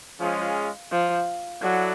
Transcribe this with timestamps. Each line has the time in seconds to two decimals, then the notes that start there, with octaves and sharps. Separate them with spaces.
0.20 F3 G#3 C#4 F4 G#4
0.92 F3
1.62 F#3 E4 A4 D5 F#5